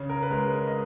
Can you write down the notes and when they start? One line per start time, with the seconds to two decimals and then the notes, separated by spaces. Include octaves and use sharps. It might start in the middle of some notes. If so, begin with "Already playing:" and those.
Already playing: C#3
0.10 A#4
0.22 B4
0.31 G#3 A#4
0.67 D#5